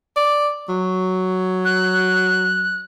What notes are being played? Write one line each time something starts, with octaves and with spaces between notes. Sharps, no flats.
D5
F#3
F#6